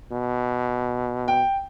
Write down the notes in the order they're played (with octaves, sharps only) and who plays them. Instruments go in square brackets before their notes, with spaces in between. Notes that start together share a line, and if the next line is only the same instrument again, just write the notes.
[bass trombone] B2
[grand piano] G5